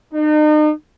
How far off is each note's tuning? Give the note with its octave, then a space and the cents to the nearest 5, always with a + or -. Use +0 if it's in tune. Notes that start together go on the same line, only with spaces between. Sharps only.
D#4 -40